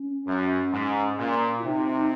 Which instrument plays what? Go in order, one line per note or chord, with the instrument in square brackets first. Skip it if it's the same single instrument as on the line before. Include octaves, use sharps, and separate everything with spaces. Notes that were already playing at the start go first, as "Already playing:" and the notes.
Already playing: [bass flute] C#4
[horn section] F#2
G#2
A#2
[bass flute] F4
[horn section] C3 [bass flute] D#4